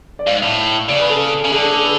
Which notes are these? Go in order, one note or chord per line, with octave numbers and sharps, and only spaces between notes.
D5
G#2 F5
A2
C#3 D5
B4
A4
C#3
D3 G#4
A4
A4
B4